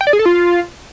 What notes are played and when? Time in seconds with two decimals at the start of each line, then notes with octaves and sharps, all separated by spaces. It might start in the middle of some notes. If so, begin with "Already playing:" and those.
0.01 G5
0.07 D5
0.13 G#4
0.19 A4
0.25 F4